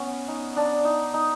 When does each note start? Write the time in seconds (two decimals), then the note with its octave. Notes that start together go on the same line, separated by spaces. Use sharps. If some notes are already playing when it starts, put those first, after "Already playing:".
Already playing: B3 C#4
0.28 D#4
0.57 D4
0.85 D#4
1.14 D#4